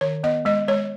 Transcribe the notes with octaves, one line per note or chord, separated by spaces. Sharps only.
D#3 C#5
B3 D#5
G#3 D#5
G#3 C#5